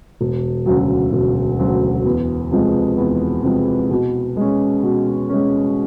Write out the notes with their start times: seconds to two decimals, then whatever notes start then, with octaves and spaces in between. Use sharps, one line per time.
0.21 E1
0.66 D2 C#3 F#3
1.13 E1
1.59 D2 C#3 F#3
2.06 E2
2.51 C3 F3 G#3
2.98 E2
3.43 C3 F3 G#3
3.91 B2
4.37 G#3 C#4
4.83 B2
5.30 G#3 C#4